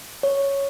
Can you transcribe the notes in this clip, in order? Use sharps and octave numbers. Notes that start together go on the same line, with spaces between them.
C#5